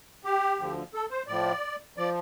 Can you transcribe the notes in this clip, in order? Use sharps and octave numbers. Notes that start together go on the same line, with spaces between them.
G4
D2 D3 F3
A4
C5
A2 F3 D5
F3 D5